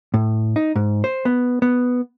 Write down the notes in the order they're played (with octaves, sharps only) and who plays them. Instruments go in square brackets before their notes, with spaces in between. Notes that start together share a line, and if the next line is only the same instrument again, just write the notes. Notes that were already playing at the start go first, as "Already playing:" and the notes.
[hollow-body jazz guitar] A2
D#4
G#2
C5
B3
B3